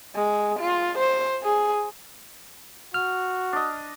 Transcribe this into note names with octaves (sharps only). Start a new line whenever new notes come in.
G#3
F4
C5
G#4
F#4 F6
D4 D#5